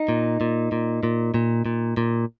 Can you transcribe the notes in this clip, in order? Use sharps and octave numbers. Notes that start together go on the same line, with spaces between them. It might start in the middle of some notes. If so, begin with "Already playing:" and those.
Already playing: D#4
A#2
A#2
A#2
A#2
A#2
A#2
A#2